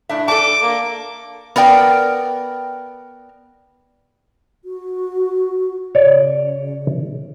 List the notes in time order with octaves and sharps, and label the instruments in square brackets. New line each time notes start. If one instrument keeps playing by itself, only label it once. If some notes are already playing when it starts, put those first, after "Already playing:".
[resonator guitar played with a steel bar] A2 D4 E5
[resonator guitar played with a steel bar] A4 D5 A5 [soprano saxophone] D6
[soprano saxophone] A#3
[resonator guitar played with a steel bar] B3 A#4 D5 G5
[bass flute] F#4
[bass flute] C#3 [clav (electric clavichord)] C#5 D5